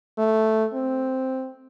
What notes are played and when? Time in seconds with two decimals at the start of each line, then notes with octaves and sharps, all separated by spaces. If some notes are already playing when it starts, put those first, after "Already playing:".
0.18 A3
0.74 C4